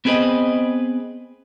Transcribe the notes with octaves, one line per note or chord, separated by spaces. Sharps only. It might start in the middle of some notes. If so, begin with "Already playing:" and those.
B3 C4 G#4 B4 D#5